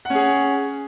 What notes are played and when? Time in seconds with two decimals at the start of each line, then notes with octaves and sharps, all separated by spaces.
0.05 F#5
0.10 C#4
0.15 G#4